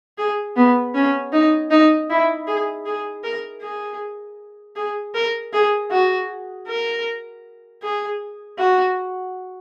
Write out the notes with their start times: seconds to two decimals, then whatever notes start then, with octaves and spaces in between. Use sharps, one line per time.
0.18 G#4
0.56 B3
0.95 C#4
1.32 D#4
1.71 D#4
2.09 E4
2.47 G#4
2.86 G#4
3.24 A#4
3.62 G#4
4.76 G#4
5.14 A#4
5.53 G#4
5.91 F#4
6.67 A#4
7.82 G#4
8.58 F#4